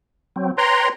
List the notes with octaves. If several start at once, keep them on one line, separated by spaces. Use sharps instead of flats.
F#3 C4
B4 C#5 G5 A#5 C6